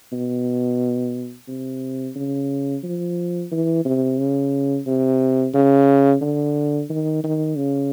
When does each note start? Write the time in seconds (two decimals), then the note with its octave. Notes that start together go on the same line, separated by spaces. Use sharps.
0.13 B2
1.48 C3
2.16 C#3
2.83 F3
3.51 E3
3.85 C3
4.18 C#3
4.87 C3
5.54 C#3
6.21 D3
6.90 D#3
7.24 D#3
7.57 C#3